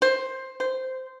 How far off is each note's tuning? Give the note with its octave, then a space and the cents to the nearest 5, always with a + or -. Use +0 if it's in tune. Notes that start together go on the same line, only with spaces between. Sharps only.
C5 +10
C5 -10